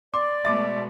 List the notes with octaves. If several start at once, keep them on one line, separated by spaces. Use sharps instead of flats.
D5 C6 D6
B2 G#3 A3 E5 D6 A6